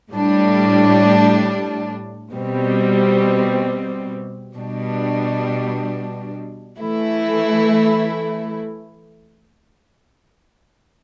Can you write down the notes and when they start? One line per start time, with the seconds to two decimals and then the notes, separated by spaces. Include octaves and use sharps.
0.10 A2 G3 D4
2.32 B2 G3 C4
4.55 B2 G3 D4
6.77 E3 A3 E4